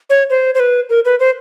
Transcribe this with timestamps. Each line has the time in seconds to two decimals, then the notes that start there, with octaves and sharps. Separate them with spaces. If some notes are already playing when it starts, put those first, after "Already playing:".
0.10 C#5
0.30 C5
0.55 C5
0.60 B4
0.90 A#4
1.05 B4
1.20 C5